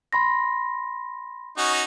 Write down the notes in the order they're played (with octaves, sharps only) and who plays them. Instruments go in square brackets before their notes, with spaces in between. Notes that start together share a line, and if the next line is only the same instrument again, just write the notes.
[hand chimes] B5 C6 A#6
[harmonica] C#4 D#4 F#4